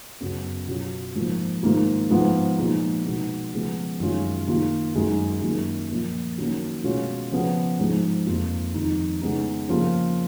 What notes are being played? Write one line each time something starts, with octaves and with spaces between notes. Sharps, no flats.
F#2 C#3 F#3 B3
B2 F#3 C#4 F4
G#2 F3 A#3
G#2 D#3 A#3 F4
G#2 F3 B3 F4
A#2 F3 G#3 B3 D#4
B2 G#3 B3 D#4
C#3 F3 G#3 B3
F#2 D#3 G#3 C#4 F4
D#3 A#3 F4
F#2 D#3 G#3 D#4
F#2 D#3 A#3 F4
A#2 F3 A#3
D#3 F#3 A#3 C#4
B2 G#3 C#4 F4
C#3 F3 B3
G#2 F3 G#3 D#4
F2 F3 A#3 F4
F2 D#3 G#3 D#4
C#3 G#3 B3 D#4
C#3 F3 A#3 F4